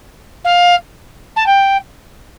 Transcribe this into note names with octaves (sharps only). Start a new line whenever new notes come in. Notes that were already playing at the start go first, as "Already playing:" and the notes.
F5
A5
G5